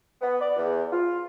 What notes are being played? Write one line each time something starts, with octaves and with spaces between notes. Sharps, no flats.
B3
D5
E2
F4